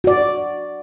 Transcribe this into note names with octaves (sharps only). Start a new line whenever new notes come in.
F#4 D5